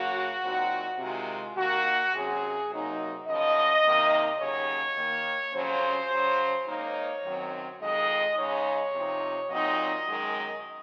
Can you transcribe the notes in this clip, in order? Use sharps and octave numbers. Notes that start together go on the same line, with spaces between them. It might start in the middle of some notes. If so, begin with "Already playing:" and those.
Already playing: C#3 F#3 A#3 F#4
A#2 F#3 C4 D#4
C3 D#3 G#3 F4
D#2 D#3 A#3 F#4
C3 F#3 C#4 G#4
C3 F#3 A#3 D#4
F#2 C#3 F3 D#5
C3 D#3 A#3 D#4
D#2 C#3 F#3 C#4 C#5
D#2 D#3 A#3
F2 C#3 F#3 C#4 C5
C#3 F#3 C#4
G#2 D#3 A#3 D#4 C#5
F#2 D#3 F#3 C4
F2 D#3 G#3 D#5
C#3 G#3 D#4 C#5
C3 F3 C4 D#4
A#2 F#3 C4 D#4 D#5
F#2 D#3 G#3